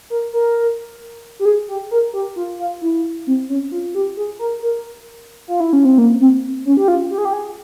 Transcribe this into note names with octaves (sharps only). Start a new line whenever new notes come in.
A#4
A#4
G4
G#4
G4
A#4
G4
F4
F4
E4
C4
C#4
F4
G4
G#4
A#4
A#4
F4
E4
C#4
C4
A#3
C4
C#4
G4
F4
G4
G#4
G4
G#4